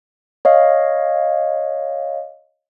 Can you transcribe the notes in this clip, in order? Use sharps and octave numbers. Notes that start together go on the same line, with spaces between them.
C#5 D#5 F5